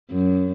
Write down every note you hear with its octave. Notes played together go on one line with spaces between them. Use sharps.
F#2